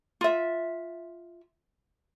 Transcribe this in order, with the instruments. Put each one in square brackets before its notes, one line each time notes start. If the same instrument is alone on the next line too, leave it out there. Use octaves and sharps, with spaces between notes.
[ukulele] F4 E5